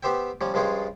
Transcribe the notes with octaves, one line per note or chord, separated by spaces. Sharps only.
B3 G4 C5 E5 G5
F3 G3 C#4
G2 F3 G#3 C#4 F4 G5